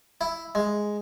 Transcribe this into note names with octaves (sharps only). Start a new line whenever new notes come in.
E4
G#3